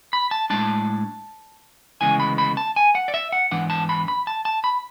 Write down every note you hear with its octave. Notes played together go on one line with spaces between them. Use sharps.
B5
A5
A2 G#3 D4 A5
D2 C#3 E3 G#3 B3 G#5
B5
B5
A5
G#5
F#5
D5
E5
F#5
G#2 E3 B3 D4 F#5
A5
B5
B5
A5
A5
B5